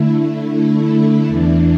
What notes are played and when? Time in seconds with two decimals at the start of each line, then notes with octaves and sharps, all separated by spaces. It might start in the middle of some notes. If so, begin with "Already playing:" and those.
Already playing: D3 A3 E4
0.50 D3 A3 E4
1.28 E2 E3 D4